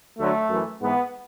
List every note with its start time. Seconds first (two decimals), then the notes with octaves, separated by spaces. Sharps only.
0.18 D2 D3 F#3 A3
0.50 F#2 E3
0.81 G#2 E3 B3